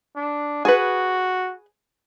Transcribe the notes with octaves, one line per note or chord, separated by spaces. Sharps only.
D4
F#4 G#4 B4